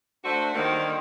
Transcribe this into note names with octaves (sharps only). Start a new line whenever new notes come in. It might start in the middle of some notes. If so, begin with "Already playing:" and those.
A3 D4 F#4 C5
D3 D#3 G3 A#3 C5